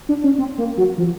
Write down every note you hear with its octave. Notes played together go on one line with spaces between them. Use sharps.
D4
C#4
C4
A#3
F#3
F3